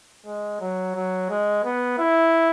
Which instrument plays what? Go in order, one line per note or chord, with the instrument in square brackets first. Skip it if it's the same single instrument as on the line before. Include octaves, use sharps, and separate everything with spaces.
[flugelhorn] G#3
F#3
F#3
G#3
B3
E4